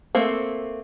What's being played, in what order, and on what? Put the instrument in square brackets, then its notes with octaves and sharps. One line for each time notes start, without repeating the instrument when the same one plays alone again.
[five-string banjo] A3 A#3 C4